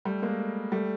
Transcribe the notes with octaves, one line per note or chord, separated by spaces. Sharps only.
G3 A3
G#3 A#3
G3 A3